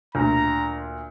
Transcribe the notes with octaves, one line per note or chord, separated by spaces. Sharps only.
D2 A#2 A#5